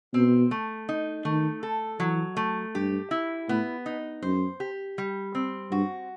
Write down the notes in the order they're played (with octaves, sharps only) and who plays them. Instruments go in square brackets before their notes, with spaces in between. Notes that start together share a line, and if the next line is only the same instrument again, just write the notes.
[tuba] B2 [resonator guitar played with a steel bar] C4
[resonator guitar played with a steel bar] A3
D#4
[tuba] D#3 [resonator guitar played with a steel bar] A3
[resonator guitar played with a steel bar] A4
[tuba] E3 [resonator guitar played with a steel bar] F#3
[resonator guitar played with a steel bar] A3
[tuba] G2 [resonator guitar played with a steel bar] G4
[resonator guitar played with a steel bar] E4
[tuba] A2 [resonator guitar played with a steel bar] B3
[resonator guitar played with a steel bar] D#4
[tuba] F#2 [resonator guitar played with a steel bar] C5
[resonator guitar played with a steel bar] G4
G3
C4
[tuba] G2 [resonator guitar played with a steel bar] F#4